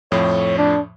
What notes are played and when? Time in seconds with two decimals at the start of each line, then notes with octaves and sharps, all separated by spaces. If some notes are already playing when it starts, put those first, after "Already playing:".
0.12 F2 A2 F3 C#5
0.58 D4